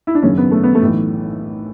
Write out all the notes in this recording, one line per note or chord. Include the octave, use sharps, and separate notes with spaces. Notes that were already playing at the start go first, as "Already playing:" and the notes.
E4
D4
G#1 F#2 C#3 C#4
B3
A3
B3
A3
B1 A2 E3